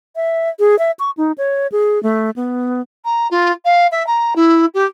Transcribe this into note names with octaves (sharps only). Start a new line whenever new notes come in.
E5
G#4
E5
C#6
D#4
C#5
G#4
A3
B3
A#5
F4
F5
E5
A#5
E4
G4